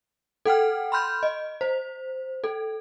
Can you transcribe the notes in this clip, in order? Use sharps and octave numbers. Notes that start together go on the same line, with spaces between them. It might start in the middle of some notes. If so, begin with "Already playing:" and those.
A4 F#5 G5 F6
B5 C6 F6 G6
D#5
C5
A4